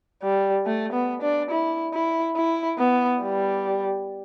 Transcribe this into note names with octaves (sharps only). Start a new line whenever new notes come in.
G3
A3
B3
D4
E4
E4
E4
B3
G3